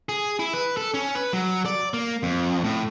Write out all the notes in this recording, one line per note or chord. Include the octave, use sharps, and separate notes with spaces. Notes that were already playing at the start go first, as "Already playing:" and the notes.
G#4
E4
B4
A4
C#4
B4
F#3
D5
A#3
F2
A2